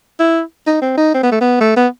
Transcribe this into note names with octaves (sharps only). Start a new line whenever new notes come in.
E4
D#4
C4
D#4
C4
B3
A3
B3
A3
B3